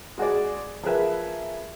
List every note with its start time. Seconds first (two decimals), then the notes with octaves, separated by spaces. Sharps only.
0.18 G#3 F#4 G#4 D5
0.83 F3 G#4 A#4 B4 E5